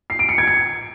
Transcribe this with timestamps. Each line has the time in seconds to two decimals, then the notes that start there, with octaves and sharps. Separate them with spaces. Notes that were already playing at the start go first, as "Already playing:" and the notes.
0.10 C7
0.19 D7
0.29 C#7
0.38 G#6
0.48 C#7